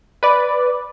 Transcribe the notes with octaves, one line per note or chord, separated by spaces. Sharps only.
B4 D5